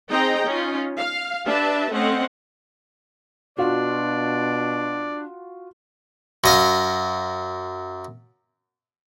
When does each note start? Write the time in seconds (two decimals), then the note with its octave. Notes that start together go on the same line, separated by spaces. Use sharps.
0.11 C4 D#4 G#4 D#5 G5 A#5
0.46 C#4 D#4 F4
0.98 F5
1.45 D4 G4 B4 E5 A5
1.90 A3 C4 C#4 D#5 F#5
3.58 B2 D4 F4 F#4 D5
6.44 F#2 D#5 F5